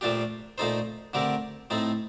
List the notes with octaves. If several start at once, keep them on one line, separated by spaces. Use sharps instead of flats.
A#2 F3 A3 D4 G4
A#2 A3 D#4 A4 C5
D3 A3 C4 G4 A#4
A2 A3 C4 D#4